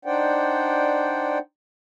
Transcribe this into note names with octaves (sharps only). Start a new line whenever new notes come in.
D4 D#4 C5 D5 F#5 G5